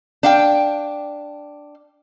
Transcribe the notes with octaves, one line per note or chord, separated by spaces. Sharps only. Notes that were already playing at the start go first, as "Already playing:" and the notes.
D4 F5 G5